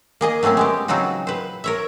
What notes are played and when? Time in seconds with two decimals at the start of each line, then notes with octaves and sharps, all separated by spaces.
0.21 A#3 G#4 D#5
0.43 F#3 A3 A#3 C4 C#4
0.57 G#3 B3 G4
0.88 C#3 F#3 C4 D#4 F4 F#4
1.27 B4 C5
1.64 A#4 C#5 E5